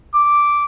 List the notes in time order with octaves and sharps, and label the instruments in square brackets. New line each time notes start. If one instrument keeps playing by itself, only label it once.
[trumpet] D6